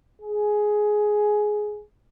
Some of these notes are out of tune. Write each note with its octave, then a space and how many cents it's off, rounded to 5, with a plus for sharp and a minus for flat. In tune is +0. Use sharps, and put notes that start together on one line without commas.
G#4 +10